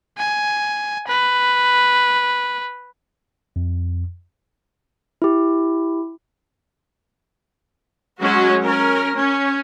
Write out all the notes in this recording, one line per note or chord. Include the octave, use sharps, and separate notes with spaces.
G#5
B4
F2
E4 G4
F#3 G#3 C#4 F#4
C#4 A#4
C#4